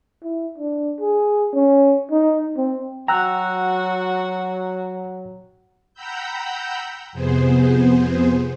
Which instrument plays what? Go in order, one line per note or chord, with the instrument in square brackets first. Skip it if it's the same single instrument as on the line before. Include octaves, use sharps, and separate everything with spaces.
[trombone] E4
D4
G#4
C#4
D#4
C4
[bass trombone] F#3 [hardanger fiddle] F#4 F#5 [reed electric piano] G5 E6 F#6 [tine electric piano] A#5
[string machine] F#5 G5 A#5 B5 E6 G6
F2 C3 B3 G#4 C5